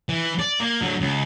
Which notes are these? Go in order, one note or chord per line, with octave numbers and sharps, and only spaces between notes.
E3
D5
A#3
D3 F#3
C#2